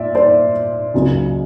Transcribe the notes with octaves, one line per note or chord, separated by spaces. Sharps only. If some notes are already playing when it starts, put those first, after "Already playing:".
Already playing: A#2 D5 E5
C5 D5
C#2 C#3 F#3 A#3